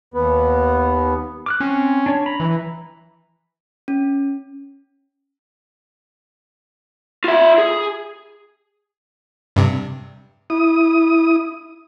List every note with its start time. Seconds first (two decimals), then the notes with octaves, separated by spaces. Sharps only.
0.14 D#2 B3
1.46 D6 F6 F#6
1.60 C4 C#4
2.06 D4 C#5
2.26 A#5 B5
2.40 E3
3.88 C#4
7.24 F4 E5
7.58 G#4
9.56 G2 C3
10.50 E4 D#6